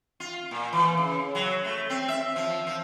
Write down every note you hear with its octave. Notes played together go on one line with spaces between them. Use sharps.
F4
A#2
E3
C#3
F#3
A3
C4
E5
F3
F3